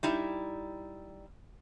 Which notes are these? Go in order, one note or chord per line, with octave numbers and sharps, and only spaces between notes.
G3 D#4 E4